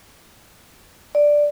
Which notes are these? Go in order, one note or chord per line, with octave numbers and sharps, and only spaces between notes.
D5